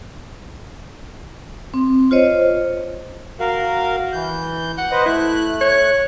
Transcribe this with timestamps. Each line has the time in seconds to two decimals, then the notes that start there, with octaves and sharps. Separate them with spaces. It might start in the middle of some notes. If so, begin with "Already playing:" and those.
1.74 C4
2.11 F4 C5 C#5 D#5
3.40 F#4 A#4 F5
4.13 E3 G6
4.78 F#5
4.91 B4 C5 D#5
5.06 A3 E4 F#6
5.61 C#5